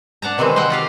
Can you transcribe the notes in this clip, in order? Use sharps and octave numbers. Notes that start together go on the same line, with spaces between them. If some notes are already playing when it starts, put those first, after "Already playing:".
D4 F#5 A5 A#5
C3 D#3 E3 G#3 C4
C5 D#5 F#5 G5
F4 G4 F5